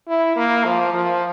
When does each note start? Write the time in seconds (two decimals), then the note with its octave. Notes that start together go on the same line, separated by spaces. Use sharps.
0.08 E4
0.36 A#3
0.65 F3
0.94 F3